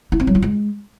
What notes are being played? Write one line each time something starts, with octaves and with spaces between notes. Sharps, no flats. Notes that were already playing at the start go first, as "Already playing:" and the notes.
E4
C4
F#3
F4
G#3